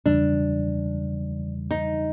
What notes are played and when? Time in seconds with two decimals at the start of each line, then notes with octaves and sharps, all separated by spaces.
0.06 E2 C#3 E3 G3 D4
1.71 D#4